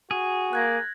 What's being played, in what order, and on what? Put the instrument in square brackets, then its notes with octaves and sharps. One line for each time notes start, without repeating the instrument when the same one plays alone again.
[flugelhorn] F#4 [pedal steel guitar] G#4
[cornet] A#3 [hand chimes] F#6 G#6 A#6